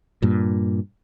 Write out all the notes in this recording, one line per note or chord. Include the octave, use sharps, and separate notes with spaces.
G2 A#2